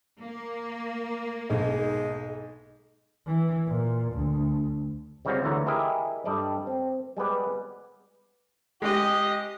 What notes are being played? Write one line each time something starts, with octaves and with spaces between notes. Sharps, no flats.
A#3
B1 G#2 G#3
E3
A#2
D2
C#2 C#3 G3 C4 F#4 F5
D2 D3 E3 C#5 A#5
E4 G4 G#4 A#4 D#5 E5
G2 G3 A4 D5 D#5
C4
G3 G#3 B3 B4 D5
G#3 G4 D#5